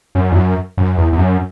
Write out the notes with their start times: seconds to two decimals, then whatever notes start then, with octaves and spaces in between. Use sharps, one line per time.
0.15 F#2
0.31 E2
0.36 F#2
0.77 F#2
0.97 E2
1.12 E2
1.19 F#2